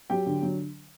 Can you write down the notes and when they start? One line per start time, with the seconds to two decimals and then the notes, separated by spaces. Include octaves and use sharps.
0.10 F#3 G4 G5
0.26 D3
0.42 F#3